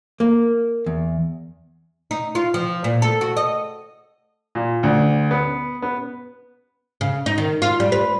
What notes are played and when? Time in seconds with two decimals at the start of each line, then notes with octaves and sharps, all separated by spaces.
0.20 A#3
0.86 E2
2.11 D#4
2.35 F4
2.54 F3
2.84 A#2
3.02 A4
3.21 F#4
3.37 D#5
4.55 A#2
4.83 D2
5.31 B3
5.82 B3
7.01 C#3
7.26 D#4
7.38 D#3
7.62 F4
7.80 G3
7.92 B4